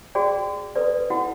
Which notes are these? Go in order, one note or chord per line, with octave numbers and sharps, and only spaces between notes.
F#4 G#4 D5 G5
A4 B4 D5
E4 F#4 F#5